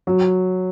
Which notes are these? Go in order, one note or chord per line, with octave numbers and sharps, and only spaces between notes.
F#3